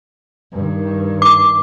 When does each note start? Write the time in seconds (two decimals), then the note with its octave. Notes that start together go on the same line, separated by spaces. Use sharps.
0.52 G2 D#3
1.22 D6